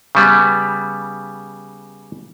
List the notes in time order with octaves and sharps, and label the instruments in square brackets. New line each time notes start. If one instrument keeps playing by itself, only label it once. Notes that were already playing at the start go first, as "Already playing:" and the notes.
[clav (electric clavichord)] C#3 G3 B3